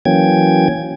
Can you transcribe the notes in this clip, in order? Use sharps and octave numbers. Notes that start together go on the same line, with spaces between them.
E3 F#3 A#3 C#4 G5 G#6